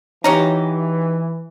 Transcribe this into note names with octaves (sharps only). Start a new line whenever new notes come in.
E3 F#3 D#4 G4 C#5 A#5